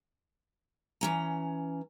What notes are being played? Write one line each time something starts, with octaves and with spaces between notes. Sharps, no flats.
E3 C#4 A#5